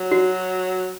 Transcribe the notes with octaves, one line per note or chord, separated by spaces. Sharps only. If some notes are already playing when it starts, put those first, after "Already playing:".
Already playing: F#3
F#4